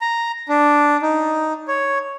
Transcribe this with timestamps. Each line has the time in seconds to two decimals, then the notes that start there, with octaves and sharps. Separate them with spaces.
0.01 A#5
0.49 D4
1.02 D#4
1.68 C#5